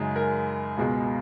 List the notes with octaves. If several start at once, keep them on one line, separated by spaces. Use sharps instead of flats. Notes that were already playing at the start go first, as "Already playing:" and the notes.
Already playing: F#2 C#3 G#3 D#4
A#4
C#2 B2 G#3